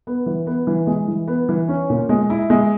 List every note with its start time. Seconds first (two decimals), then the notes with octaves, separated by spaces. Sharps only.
0.07 B3
0.26 E3
0.47 B3
0.67 E3
0.87 G#3
1.08 E3
1.28 B3
1.49 E3
1.69 C#4
1.90 A#2
2.09 G#3
2.30 E4
2.50 G#3